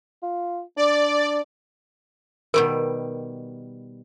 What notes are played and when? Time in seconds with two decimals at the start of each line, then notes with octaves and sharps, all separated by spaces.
0.23 F4
0.77 D4 D5
2.54 B2 D#3 G3 A#4